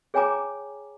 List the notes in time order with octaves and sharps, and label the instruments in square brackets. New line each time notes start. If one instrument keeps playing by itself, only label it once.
[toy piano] G#4 C#5 G5 G#5 A#5 D6